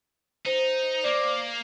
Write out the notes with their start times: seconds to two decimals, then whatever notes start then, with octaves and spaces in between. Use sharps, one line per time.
0.46 D#4 C5
1.04 A#3 D5